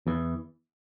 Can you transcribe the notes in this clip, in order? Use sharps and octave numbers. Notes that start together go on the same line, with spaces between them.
E2 E3